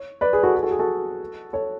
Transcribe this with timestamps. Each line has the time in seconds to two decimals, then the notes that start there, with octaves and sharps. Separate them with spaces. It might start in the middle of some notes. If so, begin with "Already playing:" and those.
Already playing: C#5
0.21 B4 D5
0.33 G#4 B4
0.43 F#4 A4
0.55 G#4
0.63 F#4 A4
0.71 G#4
0.79 F#4 A4
1.53 A4 C#5